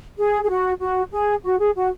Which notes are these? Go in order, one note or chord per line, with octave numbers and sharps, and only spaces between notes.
G#4
G#4
F#4
F#4
G#4
F#4
G#4
F#4